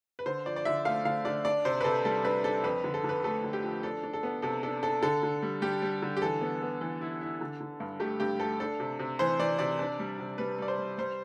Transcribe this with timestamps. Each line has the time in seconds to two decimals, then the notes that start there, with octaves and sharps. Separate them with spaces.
0.19 B4
0.26 D3 C5
0.46 F3 D5
0.56 D5
0.65 D3 E5
0.85 A3 F5
1.05 D3 F5
1.25 D3 D5
1.45 D4 D5
1.65 C3 C5
1.81 B4
1.84 C3 A4
2.05 G3 A4
2.25 D4 B4
2.44 D4 A4
2.64 F2 B4
2.84 D3
2.94 A4
3.04 D3 B4
3.24 A3 A4
3.44 D3
3.53 G4
3.63 F3
3.83 D4 A4
4.03 D4
4.14 A4
4.23 B3
4.42 C3 A4
4.63 D4 A4
4.83 D4 A4
5.03 D3 A4
5.23 D3
5.42 G3
5.62 G3 G4
5.82 G3
6.02 D3
6.17 G4
6.22 E3 A4
6.41 B3
6.62 B3
6.81 E3
7.01 E4
7.21 E4
7.41 D3
7.60 D3
7.80 G2
8.00 A3 G4
8.20 G2 G4
8.40 A3 A4
8.60 D4 A4
8.80 C3
8.99 C3
9.19 E3 C5
9.39 E3 D5
9.59 C3 D5
9.79 D4
9.99 G3
10.19 C3
10.38 G3 B4
10.58 G3 D5
10.68 C5
10.78 G3
10.98 G3 C5